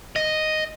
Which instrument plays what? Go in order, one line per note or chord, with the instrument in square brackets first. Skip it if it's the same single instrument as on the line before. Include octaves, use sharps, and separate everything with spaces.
[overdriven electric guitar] D#5